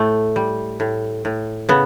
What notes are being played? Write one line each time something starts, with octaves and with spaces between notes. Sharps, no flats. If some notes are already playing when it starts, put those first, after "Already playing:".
Already playing: A2 A3
G3
A2
A2
C#3 B3